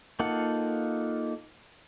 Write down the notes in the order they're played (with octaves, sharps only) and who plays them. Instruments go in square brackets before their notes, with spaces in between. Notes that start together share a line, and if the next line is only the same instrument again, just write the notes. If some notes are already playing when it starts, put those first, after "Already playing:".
[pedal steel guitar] A#3 D#4 F4 A4 F#5